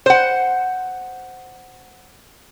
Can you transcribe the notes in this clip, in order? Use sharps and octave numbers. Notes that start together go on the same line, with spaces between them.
C5 F#5